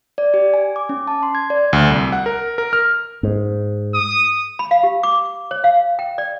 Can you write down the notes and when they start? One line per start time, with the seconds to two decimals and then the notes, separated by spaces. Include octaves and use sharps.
0.18 D5
0.34 G4
0.54 G#5
0.76 D6
0.89 C#4
1.07 A5
1.23 C6
1.35 G#6
1.50 D5
1.73 D2
1.90 C2
2.12 F#5
2.26 A#4
2.58 A#4
2.73 F6
3.23 G#2
3.94 D#6
4.59 B5
4.71 F5
4.83 G4
5.03 D6
5.51 C#5
5.64 F5
5.99 G5
6.18 D5